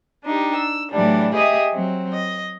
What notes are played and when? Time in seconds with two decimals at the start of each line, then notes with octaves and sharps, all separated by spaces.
0.24 D4 D#4 G4
0.56 E6
0.91 A2 E3 F#3 G3 D4
1.34 G4 G#4 D#5 E5 D#6
1.71 F#3 C4
2.13 D#5